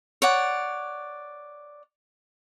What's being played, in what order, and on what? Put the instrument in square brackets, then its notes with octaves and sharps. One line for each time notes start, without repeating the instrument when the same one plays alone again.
[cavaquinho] C#5 D5 F#5